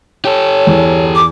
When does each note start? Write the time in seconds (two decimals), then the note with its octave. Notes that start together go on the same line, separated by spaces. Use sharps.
0.25 G4 A4 C#5
0.67 E2
1.15 D6